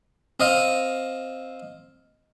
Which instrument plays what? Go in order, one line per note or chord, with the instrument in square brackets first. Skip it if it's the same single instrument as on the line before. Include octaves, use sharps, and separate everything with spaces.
[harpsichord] C4 D#5 F5